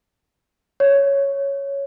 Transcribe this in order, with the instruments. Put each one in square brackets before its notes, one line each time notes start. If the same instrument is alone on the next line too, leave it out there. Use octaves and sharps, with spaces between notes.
[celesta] C#5